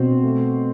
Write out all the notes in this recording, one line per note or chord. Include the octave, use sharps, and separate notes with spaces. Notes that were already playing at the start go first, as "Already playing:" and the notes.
Already playing: B2 C4 C5
A3